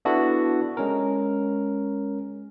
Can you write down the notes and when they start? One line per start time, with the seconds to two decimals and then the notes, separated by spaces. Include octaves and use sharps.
0.05 B3 D4 E4 F#4 A4
0.77 G#3 C#4 A#4